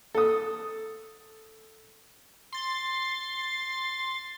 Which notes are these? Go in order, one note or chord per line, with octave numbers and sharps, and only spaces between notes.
A4 D#6
C6 A6